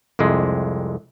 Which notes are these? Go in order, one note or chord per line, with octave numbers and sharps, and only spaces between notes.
C2 F2 C3 G#3